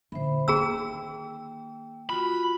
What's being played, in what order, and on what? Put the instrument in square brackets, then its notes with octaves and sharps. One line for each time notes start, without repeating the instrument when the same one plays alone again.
[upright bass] A#2 D3 [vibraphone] C5 E5 B5
[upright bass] D#3 A#3 [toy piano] G#4 A#5 E6 [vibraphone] G5
[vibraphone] F4 F#4 [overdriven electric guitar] B5